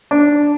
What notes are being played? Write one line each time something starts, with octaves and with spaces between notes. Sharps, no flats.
D4